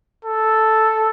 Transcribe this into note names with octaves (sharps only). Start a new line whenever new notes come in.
A4